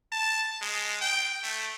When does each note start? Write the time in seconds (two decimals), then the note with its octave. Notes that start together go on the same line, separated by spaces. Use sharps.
0.12 A5
0.62 G#3
1.01 G5
1.43 A3